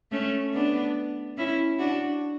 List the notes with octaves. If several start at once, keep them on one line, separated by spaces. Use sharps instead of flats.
A3 C#4
B3 D4
C#4 E4
D4 F#4